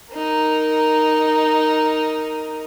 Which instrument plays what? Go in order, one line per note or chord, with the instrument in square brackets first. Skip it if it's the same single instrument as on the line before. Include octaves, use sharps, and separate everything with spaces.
[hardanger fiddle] D#4 A#4